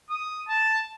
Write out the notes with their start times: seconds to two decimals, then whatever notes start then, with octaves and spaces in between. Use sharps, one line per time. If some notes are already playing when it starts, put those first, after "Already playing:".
0.10 D#6
0.49 A5